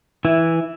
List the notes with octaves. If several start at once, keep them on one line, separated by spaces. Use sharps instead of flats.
E3 E4